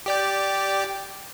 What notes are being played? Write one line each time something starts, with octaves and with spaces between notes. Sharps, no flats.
G4 D5 G5